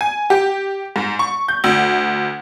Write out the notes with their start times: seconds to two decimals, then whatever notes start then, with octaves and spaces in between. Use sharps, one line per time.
0.01 G#5
0.30 G4
0.96 G#2
1.19 C#6
1.48 G6
1.64 D2